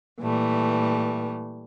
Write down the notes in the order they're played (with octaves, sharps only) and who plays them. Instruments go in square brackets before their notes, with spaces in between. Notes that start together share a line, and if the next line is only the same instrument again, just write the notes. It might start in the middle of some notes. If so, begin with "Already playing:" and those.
[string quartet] A#2 E3 G3 A3